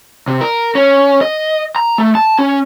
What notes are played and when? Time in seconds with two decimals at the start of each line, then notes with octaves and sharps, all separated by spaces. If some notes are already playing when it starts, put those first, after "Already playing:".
0.28 C3
0.41 A#4
0.75 C#4
1.21 D#5
1.76 A#5
1.98 A3
2.15 A5
2.39 C#4